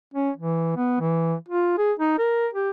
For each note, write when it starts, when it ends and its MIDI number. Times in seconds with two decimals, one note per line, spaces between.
0.14 0.30 61
0.37 0.75 52
0.77 0.97 59
1.00 1.35 52
1.48 1.76 65
1.78 1.92 68
1.99 2.17 63
2.18 2.47 70
2.54 2.70 67